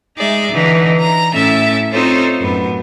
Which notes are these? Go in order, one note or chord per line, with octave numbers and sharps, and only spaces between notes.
G#3 D#4 G#4 D5 E5
D3 E3 D#4
A#5
A2 C#4 E4 A4 E5 A6
C4 D#4 F4 A4 C5 C#5
F#2 A2 B3